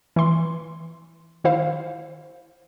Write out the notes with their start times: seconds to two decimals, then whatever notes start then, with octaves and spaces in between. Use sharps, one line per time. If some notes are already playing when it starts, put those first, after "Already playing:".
0.16 E3 C6
1.44 D#3 E4 C5 F5